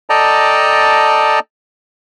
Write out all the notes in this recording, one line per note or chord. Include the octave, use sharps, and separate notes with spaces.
A4 D5 D#5 G5 A5 A#5